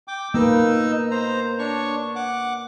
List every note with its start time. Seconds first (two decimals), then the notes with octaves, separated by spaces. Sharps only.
0.08 G5 D6
0.34 A#3 D#4 B4 D#5 E6
1.11 C5 A#5
1.59 D4 C#5 C#6
2.16 F#5 D6